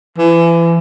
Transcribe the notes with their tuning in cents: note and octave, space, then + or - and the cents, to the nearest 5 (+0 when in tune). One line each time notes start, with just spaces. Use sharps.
E3 +30